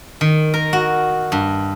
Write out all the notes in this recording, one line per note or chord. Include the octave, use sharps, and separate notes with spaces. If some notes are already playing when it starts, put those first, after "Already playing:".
D#3
A#4
F#4
G2